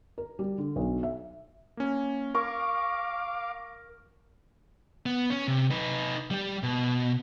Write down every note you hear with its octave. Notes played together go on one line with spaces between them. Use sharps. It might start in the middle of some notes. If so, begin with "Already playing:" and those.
A#4
G3
D3
B1
E5
A#3 C#4
A#4 F5 C#6 D6
B3
C#4
C3
D#4 B4
G3 G4
B2